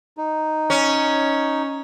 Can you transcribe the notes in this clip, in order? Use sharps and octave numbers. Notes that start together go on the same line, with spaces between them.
D#4
C#4